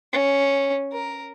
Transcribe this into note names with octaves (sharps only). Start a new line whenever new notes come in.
C#4
A#4